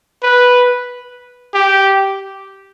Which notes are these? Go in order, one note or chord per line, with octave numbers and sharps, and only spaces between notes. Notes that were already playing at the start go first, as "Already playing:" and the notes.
B4
G4